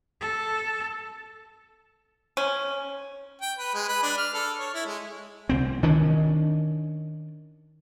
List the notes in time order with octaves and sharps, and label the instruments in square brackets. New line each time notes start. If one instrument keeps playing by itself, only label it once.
[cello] A4
[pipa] C#4
[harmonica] G5
B4
G#3
B4
D4
F6
A4
C#5
E4
G#3
[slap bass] C2 C4
D#3 C#4 D4